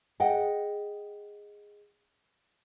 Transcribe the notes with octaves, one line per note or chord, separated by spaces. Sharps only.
G#4 D#5 F#5 G5